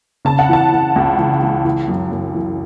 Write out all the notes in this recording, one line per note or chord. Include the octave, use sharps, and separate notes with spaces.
C#3 A5
F#5
E3 A5
E3
C#2
E3
E3
E3
F#2
F#2
E3